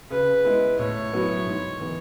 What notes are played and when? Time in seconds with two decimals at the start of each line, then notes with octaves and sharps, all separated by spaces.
0.10 C#3 B4
0.45 G#3 B3 E4
0.79 A2 C#5
1.12 F#3 B3 E4
1.46 G#2
1.80 E3 B3